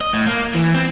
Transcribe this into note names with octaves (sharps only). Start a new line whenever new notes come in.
D#5
A2
A#3
E3
C4